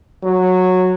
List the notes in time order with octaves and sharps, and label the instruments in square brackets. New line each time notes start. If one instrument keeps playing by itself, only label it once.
[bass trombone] F#3